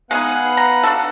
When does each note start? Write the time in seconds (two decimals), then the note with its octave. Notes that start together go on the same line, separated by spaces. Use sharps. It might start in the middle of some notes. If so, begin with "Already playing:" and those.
0.11 G#3 B3 D#4 G#4 B4 F5 F#5
0.57 A#5
0.83 D4 F#4 A4